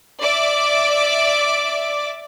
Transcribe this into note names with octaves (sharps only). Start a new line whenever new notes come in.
D5 E5 D6